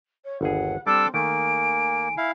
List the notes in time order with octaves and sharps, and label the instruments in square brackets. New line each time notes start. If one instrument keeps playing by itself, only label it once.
[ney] C#5
[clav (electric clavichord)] G1 D#2 G#4 [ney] F#5
[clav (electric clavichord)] G3 [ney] C4 [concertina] D4 A4 D6 [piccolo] E6
[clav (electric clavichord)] D#3 A3 [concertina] A#3 [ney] G#5 [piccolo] D7
[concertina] E4 F5